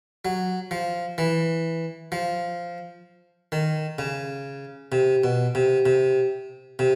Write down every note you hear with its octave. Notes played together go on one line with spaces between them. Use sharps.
F#3
F3
E3
F3
D#3
C#3
C3
B2
C3
C3
C3